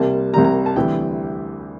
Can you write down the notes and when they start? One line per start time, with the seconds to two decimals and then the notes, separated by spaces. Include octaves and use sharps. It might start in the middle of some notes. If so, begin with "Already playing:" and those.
Already playing: C2 C3 G3 A#3 A5
0.33 C2 C3 G3 A#3 A#5
0.44 A#5
0.66 A5
0.76 D2 C3 E3 G3 G5